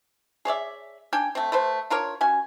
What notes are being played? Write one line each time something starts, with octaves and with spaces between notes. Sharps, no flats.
G#4 C#5 D5 E5
D4 G5 G#5
A3 C4
A3 B4 C5
D4 F4 A#4 C#5
C#4 F#4 G#5